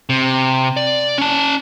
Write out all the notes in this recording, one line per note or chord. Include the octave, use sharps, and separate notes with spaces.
C3
D5
C#4 A5